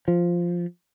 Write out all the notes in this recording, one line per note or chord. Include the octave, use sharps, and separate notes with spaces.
F3